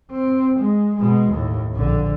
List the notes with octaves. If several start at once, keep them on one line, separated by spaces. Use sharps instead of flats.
C4
G#3
B2 G#3
D#2 A2
A#1 D3